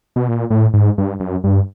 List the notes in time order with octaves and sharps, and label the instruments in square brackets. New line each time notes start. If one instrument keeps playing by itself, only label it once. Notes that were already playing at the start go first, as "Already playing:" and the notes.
[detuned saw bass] B2
A#2
A2
G#2
G2
F#2
G2